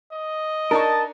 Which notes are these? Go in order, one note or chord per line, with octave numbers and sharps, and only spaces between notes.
D#5
D4 D#4 A#4 A5 C#6